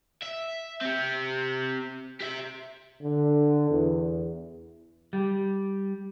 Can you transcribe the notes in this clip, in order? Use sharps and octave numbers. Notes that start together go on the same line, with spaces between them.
E5
C4 G4
G4 E5
D3
E2
G3